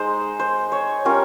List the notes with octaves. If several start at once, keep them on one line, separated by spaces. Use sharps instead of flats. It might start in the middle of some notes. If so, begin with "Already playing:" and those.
Already playing: G#3 D#4 C5
C5
C#5
G3 C#4 F4 A#4